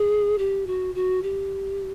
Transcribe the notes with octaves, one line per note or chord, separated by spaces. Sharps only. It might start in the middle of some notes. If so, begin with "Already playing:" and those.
Already playing: G#4
G4
F#4
F#4
G4